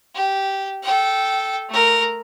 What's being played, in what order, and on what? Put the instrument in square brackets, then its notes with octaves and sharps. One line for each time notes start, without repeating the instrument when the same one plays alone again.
[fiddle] G4
A4 G5
A3 A#4